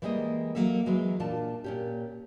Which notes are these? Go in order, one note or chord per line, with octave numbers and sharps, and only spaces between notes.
E3 G3 G#3 A#3 D#5
F#3 A#3 A4 E5
E3 F#3 G#3
A#2 D4 F4 A5
A#2 C#4 G4